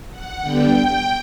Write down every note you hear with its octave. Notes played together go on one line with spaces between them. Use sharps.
F#5
D3 G3 B3 G5